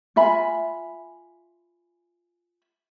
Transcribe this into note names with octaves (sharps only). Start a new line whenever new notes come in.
F4 E5 G#5 B5